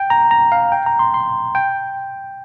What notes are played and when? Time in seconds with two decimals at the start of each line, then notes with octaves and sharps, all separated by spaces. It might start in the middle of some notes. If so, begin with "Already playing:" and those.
Already playing: G5
0.10 A#5
0.31 A#5
0.52 F5
0.72 G5
0.86 A#5
0.99 C6
1.14 C6
1.55 G5